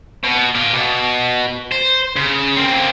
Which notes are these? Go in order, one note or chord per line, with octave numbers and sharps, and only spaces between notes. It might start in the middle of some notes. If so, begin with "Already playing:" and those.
B2
D5 F5
B2
C5
C#3
A#3 C4